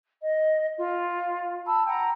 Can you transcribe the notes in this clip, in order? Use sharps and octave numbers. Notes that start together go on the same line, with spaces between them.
D#5
F4
A5 B5 E6
F#5 G5 A#5